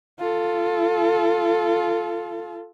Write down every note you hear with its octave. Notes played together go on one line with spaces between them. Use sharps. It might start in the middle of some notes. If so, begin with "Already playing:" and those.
F4 A4